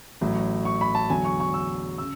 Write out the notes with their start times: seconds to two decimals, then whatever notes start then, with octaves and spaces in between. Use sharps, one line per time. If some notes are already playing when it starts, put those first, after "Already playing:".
0.21 A1 A2 F#3
0.65 C#6
0.81 B5
0.95 A5
1.10 E2 D3 F#3 G#5
1.25 C#6
1.40 C#6
1.54 E6
1.98 C#3 E6